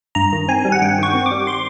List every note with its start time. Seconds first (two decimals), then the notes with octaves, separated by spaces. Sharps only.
0.15 G2 A#5
0.32 D#3
0.48 C4 G#5
0.65 G3
0.72 F#5
0.82 G2 G5
0.98 D#3 C#6
1.14 C4
1.26 D6
1.31 G3
1.47 C6